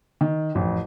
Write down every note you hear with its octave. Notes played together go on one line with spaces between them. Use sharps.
D#3
A1 F2